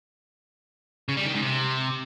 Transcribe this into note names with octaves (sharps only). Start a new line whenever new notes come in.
C#3
G3
D#3
G#2
C3